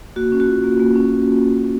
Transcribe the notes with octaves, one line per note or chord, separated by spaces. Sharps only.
A#3 F#4
C#4
F#4
F4
A#3
A#3
C#4